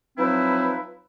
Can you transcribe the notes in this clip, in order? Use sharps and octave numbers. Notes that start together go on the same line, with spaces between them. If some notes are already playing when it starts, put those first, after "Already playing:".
F3 F#3 C4 D#4 E4 B4